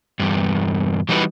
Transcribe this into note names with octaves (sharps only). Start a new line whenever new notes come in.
E2 G2
E3 G3 D#4 F#4 B4